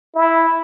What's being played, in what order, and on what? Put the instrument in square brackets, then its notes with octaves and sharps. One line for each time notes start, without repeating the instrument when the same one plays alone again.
[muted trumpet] E4